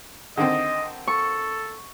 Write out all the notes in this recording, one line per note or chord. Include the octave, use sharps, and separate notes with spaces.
D3 D#3 C4 D#5
A4 C#6